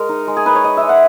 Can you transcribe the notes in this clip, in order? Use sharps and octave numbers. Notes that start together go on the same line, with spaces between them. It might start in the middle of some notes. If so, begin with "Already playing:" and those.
Already playing: G#3 A#4
D#4
G#3
G#4
D#4 B4
C#5
D#4 D#5
E5
G#3
F#5